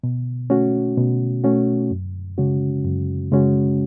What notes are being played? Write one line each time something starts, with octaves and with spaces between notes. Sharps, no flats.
B2
A3 C#4 F#4
B2
A3 C#4 F#4
F#2
C#3 G#3 C#4 F#4
F#2
C#3 G#3 C#4 F#4